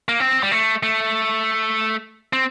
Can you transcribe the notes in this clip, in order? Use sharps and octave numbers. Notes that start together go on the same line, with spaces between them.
A#3
C4
G3
A3
A3
C4